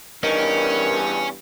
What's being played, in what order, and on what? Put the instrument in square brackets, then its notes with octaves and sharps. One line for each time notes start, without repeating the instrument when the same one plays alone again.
[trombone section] E2 G2 [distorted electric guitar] C#4 [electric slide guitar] A#4 D#5